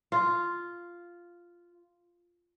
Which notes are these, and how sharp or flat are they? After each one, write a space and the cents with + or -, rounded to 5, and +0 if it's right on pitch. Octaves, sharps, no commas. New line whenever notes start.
F4 -5